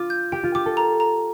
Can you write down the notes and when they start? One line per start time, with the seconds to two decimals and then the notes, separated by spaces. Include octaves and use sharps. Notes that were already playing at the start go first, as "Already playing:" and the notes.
Already playing: F4 D6
0.10 G6
0.32 G4 G5
0.44 F4
0.55 G4 D6
0.66 A4
0.77 A#5
1.00 A#5